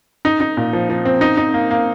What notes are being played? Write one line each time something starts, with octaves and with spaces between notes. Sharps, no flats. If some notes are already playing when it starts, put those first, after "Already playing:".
D#4
D#4
A#2
F3
F3
C4
D#4
D#4
A#3
A#3